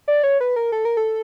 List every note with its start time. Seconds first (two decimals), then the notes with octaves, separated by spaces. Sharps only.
0.08 D5
0.23 C#5
0.41 B4
0.56 A#4
0.72 A4
0.85 A#4
0.97 A4